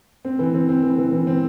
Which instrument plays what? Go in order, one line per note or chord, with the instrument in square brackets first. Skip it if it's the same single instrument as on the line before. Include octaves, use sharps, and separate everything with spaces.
[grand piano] C4
E3
C4
C4
E3
E3
E3
C4